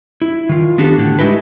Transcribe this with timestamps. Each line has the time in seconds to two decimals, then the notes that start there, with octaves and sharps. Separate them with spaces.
0.22 E4
0.49 D#3 F4
0.78 B3 D4 F#4 G4 A4
0.98 A2 D3
1.19 G#3 D#4 E4 F#4 G4 B4